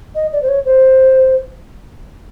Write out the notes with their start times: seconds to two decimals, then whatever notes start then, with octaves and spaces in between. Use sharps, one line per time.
0.15 D#5
0.32 D5
0.42 C5
0.48 C#5
0.66 C5